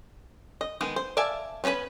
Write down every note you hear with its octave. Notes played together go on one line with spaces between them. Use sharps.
D#5
D#3 G#3 B3
C5
D5 E5 F5 G#5 A5
B3 C#4 D4 B4 B5